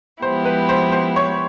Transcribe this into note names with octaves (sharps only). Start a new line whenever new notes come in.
F3 G#3 B3 E4 G4 C5
B4
C5
C5
C#5